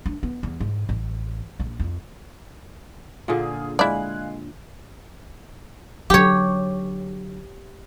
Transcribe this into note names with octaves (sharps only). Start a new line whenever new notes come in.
D4
B3
E2
G#2
A1
A#1
F2
A#2 D3 F4 G#4
G#3 E4 D5 F5 G#5 F#6
D3 F#3 G4 C#5